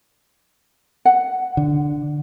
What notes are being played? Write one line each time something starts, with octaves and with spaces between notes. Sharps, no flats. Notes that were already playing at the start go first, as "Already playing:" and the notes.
F#5
D3